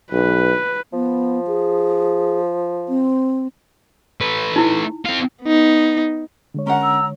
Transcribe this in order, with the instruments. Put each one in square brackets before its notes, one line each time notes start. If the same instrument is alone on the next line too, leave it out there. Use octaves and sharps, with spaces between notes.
[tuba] B1 [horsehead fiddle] B4
[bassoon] F3 [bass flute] B3
[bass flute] G#4
C4
[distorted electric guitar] A3 B4
[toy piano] D#4 E4
[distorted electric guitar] C4 F4
[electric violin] B3 D#4
[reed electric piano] D3 G#3 C#5
[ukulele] C#4 A#4 F#5 [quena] A#5
[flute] E6